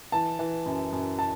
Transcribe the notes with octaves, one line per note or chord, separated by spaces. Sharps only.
E3 A5
E3
F#2
F#2
A5